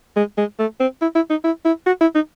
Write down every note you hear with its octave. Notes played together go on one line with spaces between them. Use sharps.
G#3
G#3
A3
C4
E4
E4
D#4
E4
E4
F#4
E4
D#4